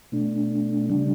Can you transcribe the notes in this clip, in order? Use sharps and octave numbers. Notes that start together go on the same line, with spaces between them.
B2 A3 D4
C#3 G3 D4